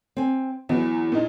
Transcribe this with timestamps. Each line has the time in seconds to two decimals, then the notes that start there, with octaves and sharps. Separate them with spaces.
0.17 C4 G#5
0.69 E2 E3 F#3
1.12 A#2 D#4